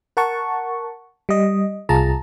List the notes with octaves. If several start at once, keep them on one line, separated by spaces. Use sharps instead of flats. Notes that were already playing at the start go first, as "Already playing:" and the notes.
A#4 F#5 A5 C#6
G3 D#5
C2 F4 G#4 A5 A#5